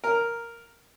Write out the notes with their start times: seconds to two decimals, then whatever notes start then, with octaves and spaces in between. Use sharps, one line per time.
0.04 A#4